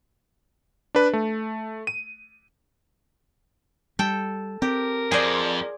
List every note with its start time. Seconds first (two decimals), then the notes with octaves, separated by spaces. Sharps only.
0.95 D4 B4
1.13 A3
1.87 D#7
3.99 G3 A4 G5
4.62 C4 G4 A#4
5.12 F2 G#4 C5 D5